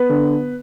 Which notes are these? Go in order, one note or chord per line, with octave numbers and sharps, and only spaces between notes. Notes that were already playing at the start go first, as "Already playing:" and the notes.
Already playing: B3 B4
D3